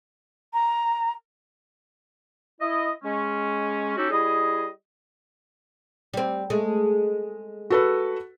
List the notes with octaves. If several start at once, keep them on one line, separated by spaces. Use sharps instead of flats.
A#5
E4 D#5
G#3 C#4
C#4 D#4 F#4 G4 A4
G3 E4 G#4 D#5
G3 C4
G#3 A3
F#4 A4 B4